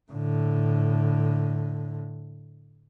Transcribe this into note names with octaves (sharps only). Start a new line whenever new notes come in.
A2 D3